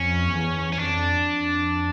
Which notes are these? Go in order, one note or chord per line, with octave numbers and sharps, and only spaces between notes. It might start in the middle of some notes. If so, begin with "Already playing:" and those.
Already playing: F2 C#4
E2
C#4
F2 D4
F2